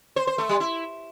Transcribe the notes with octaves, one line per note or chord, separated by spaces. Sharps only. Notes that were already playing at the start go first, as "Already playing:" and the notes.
C5
C5
A3
G3
E4